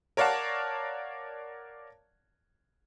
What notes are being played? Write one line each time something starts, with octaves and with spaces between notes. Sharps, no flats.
A#4 C#5 D5 F5 F#5 A5